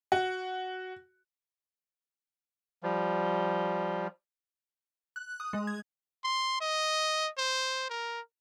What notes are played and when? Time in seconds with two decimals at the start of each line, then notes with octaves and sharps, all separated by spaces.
0.12 F#4
2.83 F3 G3
5.16 F#6
5.40 D#6
5.53 G#3
5.67 G#6
6.24 C6
6.61 D#5
7.38 C5
7.90 A#4